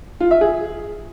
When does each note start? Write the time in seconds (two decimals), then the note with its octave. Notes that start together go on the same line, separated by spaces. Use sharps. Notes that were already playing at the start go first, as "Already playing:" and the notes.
0.20 F4
0.31 E5
0.41 G#4